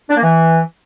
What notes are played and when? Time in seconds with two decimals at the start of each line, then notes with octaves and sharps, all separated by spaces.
0.10 D4
0.16 A#3
0.22 E3